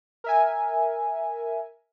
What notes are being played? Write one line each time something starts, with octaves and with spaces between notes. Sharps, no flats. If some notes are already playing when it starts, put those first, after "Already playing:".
A#4 E5 G#5